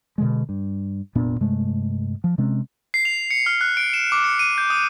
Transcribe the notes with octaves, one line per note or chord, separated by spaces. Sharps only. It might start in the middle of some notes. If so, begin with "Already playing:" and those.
B2 D3 G#3
G2
F1 A#2 B3 D4
G2 C3 G#3 A3
F3
C3 G#3 C4 C#4
C7
F7
C#7
F6
F#6
D7
E7
D6
C#7
D#7
G6
D#6